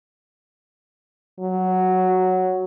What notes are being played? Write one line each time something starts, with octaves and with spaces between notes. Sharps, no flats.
F#3